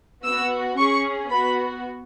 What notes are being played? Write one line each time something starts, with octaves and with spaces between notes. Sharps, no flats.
B3 F#4 E6
C#4 G#4 C#6
B3 F#4 B5